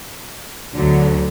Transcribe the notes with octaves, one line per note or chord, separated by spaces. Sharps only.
D2 D3 F#3